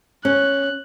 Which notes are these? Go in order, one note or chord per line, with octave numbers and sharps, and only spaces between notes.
C#4 F#6